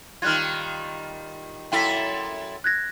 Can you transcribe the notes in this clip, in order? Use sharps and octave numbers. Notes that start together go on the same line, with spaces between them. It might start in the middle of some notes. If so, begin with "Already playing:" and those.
D#3 G3 F4 F6 F#6 G#6
F#2 E4 A4 G5 B6
F#6 G#6 A#6